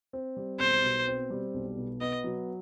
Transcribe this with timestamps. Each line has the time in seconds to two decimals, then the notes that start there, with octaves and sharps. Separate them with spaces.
0.13 C4
0.37 G3
0.60 B1 C5
0.84 B2
1.07 C4
1.30 G3
1.54 B1
1.77 B2
2.01 B3 D#5
2.24 F#3